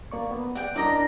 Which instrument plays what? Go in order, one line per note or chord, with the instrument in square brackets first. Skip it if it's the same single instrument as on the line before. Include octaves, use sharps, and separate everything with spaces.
[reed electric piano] A#3 D5 C#6
B3
[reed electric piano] D5 [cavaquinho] F#5 G5
[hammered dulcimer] D4 A#4 D6 [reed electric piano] E4 [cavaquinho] D5 D#5 A#5